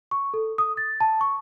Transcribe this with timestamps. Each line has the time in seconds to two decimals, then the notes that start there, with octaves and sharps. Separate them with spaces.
0.11 C#6
0.34 A4
0.58 D#6
0.77 A6
1.00 A5
1.21 C#6